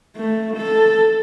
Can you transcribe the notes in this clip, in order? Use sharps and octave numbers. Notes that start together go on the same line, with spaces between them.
A3
A4